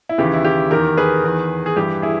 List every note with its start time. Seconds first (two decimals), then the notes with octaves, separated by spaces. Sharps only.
0.09 E4
0.18 D#2 C#3 E3 G4
0.34 E4
0.45 G4
0.71 E2 D#3 G4 A#4
0.97 G#4 B4
1.24 E2 D#3
1.66 G#4
1.76 G2 E3 G4
2.02 E4 G#4